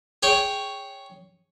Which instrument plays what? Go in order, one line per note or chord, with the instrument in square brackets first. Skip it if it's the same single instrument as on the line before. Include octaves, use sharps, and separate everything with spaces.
[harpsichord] G#4 C#5 G5